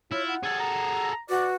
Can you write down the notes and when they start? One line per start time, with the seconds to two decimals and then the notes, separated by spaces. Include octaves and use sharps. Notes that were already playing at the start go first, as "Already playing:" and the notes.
0.12 E4 F4 C#5
0.28 F#5
0.43 G#4 A4 C#5
0.60 A#5
1.29 F#4 B4 D5